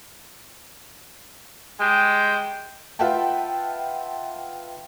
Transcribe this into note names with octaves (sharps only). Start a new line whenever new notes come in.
G3 G#3 G5
F4 B4 E5 F#5 G5 A5